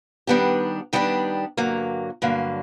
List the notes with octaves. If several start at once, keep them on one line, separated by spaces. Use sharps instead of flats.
D#3 G3 B3 D4 G4
D#3 G3 B3 D4 G4
G2 D3 F#3 A#3
G2 D3 F#3 A#3